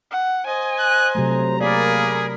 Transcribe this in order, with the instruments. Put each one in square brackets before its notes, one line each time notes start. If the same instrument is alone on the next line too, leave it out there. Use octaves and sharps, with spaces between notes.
[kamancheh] F#5
[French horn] C5 [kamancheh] D#5 G#5
[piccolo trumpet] F#6
[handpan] C3 F#3 A3 [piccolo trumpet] A#5
[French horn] A#3 [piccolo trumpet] G#4 [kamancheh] A#4 B5 [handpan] D5